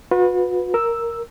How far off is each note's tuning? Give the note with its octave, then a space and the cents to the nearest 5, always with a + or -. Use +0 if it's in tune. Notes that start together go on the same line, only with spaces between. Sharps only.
F#4 -40 B4 +0
A#4 +0 E6 +0